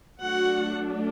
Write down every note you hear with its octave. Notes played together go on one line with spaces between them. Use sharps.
F#3 A3 D4 F#4 F#5